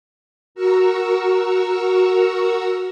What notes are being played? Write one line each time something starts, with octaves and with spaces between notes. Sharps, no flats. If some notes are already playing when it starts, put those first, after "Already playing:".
F#4 A#4 A#5 C#6 E6